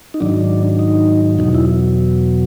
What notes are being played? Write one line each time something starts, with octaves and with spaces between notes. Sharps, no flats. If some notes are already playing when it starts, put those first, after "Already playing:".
D#4
G#2 D#3 F#3 D4
D#4
E2 B2 F#3 D#4
E4